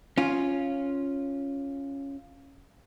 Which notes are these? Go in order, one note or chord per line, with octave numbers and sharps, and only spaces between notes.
C#4 F4